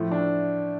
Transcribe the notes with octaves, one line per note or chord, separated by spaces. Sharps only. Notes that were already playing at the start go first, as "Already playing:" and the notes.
Already playing: A2 F3 A3 E4
D4